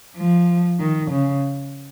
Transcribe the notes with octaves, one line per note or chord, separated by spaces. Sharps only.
F3
D#3
C#3